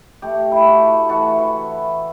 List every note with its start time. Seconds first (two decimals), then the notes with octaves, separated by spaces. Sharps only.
0.22 A3 G4
0.52 E4
0.66 F#4 A4
0.81 A3
1.09 E3 F#4 A4
1.39 E3